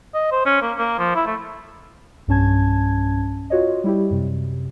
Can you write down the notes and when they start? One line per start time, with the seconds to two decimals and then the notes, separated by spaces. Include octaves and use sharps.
0.14 D#5
0.32 C5
0.46 C#4
0.62 A#3
0.79 A#3
0.99 F3
1.15 E4
1.27 A3
2.27 B1 G2 C#4 A5 G#6
3.50 F4 F#4 C#5 D#5
3.84 G3 E4 G4
4.10 F#2 C3